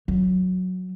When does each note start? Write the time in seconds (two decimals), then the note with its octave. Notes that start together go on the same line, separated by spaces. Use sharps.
0.08 F#3